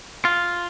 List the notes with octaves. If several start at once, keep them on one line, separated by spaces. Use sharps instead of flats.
F4